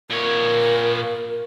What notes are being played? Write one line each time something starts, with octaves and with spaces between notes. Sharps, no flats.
A#2 A#4 C#5